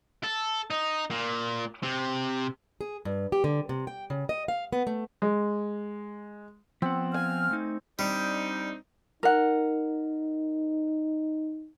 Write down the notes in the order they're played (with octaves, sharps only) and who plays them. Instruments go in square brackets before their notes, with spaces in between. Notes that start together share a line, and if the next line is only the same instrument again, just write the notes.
[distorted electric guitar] A4
D#4
A#2
C3
[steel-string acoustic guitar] G#4
G2
G4
D3
C3
G5
C#3
D#5
F5
B3
A3
[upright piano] G#3
[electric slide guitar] F3 B3 F#5 [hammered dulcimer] C4
[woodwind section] F5 F6 [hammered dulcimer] G#5
[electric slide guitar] A3 D#4
[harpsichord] G3 [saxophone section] C4 D4 D#4
[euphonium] D#4 [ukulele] A#4 F#5